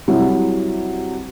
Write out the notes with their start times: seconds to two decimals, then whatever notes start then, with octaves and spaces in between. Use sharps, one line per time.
0.08 C3 F#3 G3 E4